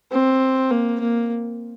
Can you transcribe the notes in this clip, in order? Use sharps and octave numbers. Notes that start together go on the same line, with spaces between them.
C4
A#3
A#3